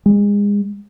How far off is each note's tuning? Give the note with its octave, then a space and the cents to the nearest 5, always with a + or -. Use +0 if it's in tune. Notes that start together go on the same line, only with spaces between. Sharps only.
G#3 -30